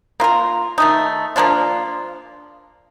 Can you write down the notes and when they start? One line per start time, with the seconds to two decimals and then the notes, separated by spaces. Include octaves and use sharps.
0.20 A#3 F4 A#4
0.78 D#3 A3 D#4
1.36 F3 A#3 D4 F4